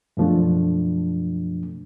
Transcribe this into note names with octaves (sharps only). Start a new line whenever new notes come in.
F#2 B2 F3 A3 D4